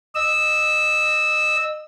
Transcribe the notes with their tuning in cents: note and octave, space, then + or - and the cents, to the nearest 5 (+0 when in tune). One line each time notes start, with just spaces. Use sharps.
D#5 -25 E6 -10